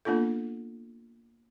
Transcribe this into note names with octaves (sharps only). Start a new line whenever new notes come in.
A#3 B3 D4 F4 A4